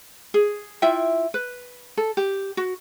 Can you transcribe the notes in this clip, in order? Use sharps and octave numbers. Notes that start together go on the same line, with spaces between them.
G#4
E4 F4 E5 G5
B4
A4
G4
F#4